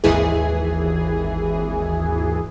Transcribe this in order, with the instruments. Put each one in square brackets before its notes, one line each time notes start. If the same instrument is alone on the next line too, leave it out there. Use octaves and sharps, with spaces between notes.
[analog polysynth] G#1 D#2 E3 G#4